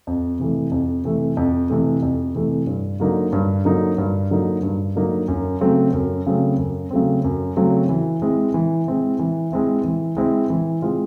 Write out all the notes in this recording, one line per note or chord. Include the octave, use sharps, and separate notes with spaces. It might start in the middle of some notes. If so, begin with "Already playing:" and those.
F2
C3 E3 A3
F2
C3 E3 A3
F2
C3 E3 A3
F2
C3 E3 A3
G2
D3 F#3 A#3 D#4
G2
D3 F#3 A#3 D#4
G2
D3 F#3 A#3 D#4
G2
D3 F#3 A#3 D#4
F#2
C#3 F#3 A3 C4
F#2
C#3 F#3 A3 C4
F#2
C#3 F#3 A3 C4
F#2
C#3 F#3 A3 C4
E3
G#3 C4 E4
E3
G#3 C4 E4
E3
G#3 C4 E4
E3
G#3 C4 E4
E3
G#3 C4 F4